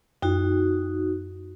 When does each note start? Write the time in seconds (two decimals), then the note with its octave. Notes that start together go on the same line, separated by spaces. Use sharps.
0.22 F#2 D#4 F#4